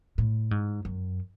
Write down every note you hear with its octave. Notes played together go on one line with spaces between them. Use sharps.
A2
G#2
F#2